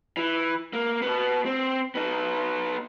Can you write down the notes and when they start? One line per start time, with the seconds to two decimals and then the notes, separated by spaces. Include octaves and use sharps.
0.17 E3
0.73 A#3
1.02 B2 B3
1.45 C4
1.95 B3 D#4